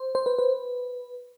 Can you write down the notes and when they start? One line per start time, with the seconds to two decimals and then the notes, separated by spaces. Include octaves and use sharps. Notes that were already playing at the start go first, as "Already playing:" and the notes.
Already playing: C5
0.15 C5
0.26 B4
0.39 B4